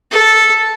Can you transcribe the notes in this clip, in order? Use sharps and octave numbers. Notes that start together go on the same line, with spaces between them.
A4